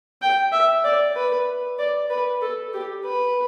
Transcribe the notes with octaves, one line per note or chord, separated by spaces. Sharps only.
G5
E5
D5
B4
D5
B4
A4
G4
B4